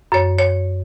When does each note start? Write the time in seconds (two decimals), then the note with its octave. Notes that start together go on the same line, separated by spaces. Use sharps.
0.12 F#2 C#5
0.38 C#5